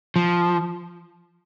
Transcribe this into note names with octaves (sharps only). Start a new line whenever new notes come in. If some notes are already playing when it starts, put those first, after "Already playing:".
F3